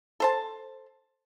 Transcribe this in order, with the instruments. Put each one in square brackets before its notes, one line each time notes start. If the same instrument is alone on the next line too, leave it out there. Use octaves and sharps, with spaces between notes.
[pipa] A4 C5 A5